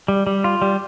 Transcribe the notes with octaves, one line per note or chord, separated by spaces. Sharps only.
G3
G3
F4
G3